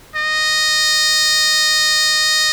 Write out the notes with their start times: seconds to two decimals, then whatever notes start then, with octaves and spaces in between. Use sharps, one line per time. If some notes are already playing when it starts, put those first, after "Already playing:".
0.15 D#5